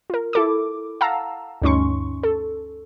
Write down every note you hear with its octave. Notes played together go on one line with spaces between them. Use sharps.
F4 A#4
E4 A4 D6
F5 F#5 A5 A#5 E6
D2 G2 C#4 D#4 C6 C#6
A4